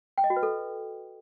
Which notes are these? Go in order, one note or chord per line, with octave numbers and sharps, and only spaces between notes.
G5
D#5
F#4
B4
A4